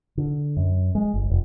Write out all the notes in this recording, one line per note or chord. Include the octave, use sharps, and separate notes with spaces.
D3
F#2
G#3
G1
F1